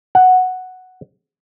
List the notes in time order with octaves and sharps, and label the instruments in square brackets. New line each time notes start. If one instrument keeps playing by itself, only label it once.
[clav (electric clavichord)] F#5